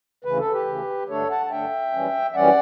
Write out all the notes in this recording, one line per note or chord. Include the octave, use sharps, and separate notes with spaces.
D2 C#3 E3 B4
A4
G4 B4
D2 C#3 E3
G2 D3 A3 D4 A4 C#5
F#5 A5
A5
G2 D3 A3 D4 E5 G5
F#2 E3 G3 C#4
E5
F#2 E3 G3 C#4 D5 F#5